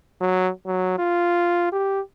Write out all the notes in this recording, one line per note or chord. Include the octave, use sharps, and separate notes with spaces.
F#3
F#3
F4
G4